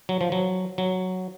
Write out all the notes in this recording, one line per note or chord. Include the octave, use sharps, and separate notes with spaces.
F#3
F3
F#3
F#3